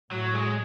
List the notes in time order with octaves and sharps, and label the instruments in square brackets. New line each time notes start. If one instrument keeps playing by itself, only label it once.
[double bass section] A2 [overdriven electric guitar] F#3
[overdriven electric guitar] G#3